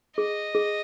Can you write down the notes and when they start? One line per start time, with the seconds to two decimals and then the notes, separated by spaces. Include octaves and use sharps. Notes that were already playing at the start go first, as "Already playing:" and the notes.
0.17 G#4 D#5
0.55 G#4